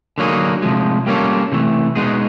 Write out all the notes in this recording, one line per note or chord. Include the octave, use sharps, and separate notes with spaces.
D3 F#3 A#3 D#4 G#4
C3 F3 G#3
G3 A#3 C#4 F4 A4
C3 E3 A3
B2 G#3 B3 D#4 G#4